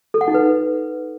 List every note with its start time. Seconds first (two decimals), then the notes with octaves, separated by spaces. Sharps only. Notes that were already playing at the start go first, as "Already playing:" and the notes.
0.14 A4
0.21 F#5
0.28 D#4
0.34 B4